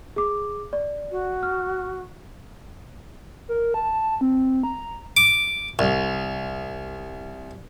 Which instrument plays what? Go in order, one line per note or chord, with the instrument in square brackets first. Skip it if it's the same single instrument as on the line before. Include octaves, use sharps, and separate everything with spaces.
[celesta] G#4 D6
D5
[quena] F#4
[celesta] F6
[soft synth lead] A#4
A5
C4
A#5
[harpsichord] D6
C2